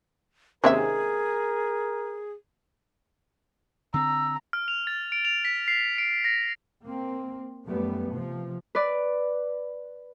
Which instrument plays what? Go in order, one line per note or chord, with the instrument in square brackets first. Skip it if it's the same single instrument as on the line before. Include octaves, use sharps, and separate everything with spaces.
[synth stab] D#2 C3 [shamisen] G#3 C#4 E5 [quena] G#4 [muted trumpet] A#4
[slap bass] D3 C4 [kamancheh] A#5 [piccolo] E6
[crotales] F6
F7
A6
D7
F7
B6
C7
D7
A#6
[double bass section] A#3 C4
F#2 G3 A3 B3
C3 F3
[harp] B4 D5